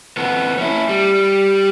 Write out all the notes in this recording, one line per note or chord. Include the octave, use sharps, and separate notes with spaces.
F2 B3
C#4 E4
G3